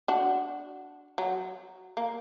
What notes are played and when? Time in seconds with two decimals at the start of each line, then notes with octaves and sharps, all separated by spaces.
0.08 D4 F#4
1.18 F#3
1.97 A#3